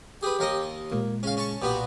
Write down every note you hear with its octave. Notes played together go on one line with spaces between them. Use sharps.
G4 G#4 B4
D#2 A#4 D#5
A#2 G#3 A#3
C#3 C#4 F5
C#4 A5 C#6
B1 A#2 B3 F#4 G4